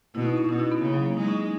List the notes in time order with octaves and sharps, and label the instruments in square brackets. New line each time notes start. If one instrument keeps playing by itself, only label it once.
[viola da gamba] B2 [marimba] E4
[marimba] D#4
C#4
[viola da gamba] B2 [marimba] D#4
[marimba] E4
B3
[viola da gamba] C#3 [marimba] A#3
[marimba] F#3
A#3
[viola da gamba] G#3 [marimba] D#4
[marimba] C#4
D#4